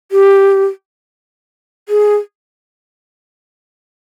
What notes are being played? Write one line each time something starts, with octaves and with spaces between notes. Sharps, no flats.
G4
G#4